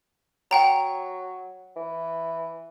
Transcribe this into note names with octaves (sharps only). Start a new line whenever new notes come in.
F#3 F#5 G5 A#5
E3